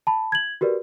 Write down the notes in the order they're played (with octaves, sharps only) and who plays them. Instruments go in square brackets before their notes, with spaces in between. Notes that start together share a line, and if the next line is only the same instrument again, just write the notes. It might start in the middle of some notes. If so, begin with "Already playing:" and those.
[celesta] A5 B5
G#6 F#7
F#4 G4 A#4 B4 D5